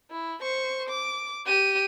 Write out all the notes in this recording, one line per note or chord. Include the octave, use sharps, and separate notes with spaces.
E4
C5 C#6
D6
G4 D#7